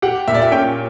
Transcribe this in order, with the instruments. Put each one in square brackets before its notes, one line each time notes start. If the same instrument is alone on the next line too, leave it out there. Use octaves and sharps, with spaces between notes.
[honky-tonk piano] G4 [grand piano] F#5
[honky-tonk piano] A#2 [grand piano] E5
[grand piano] D5
E5
[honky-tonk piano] C#4 [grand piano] G5